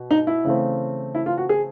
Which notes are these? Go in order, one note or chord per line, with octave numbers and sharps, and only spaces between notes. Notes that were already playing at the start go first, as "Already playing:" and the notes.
Already playing: B2
D#4
E4
C#3 E3 A3 C4
E4
F4
F#4
G#4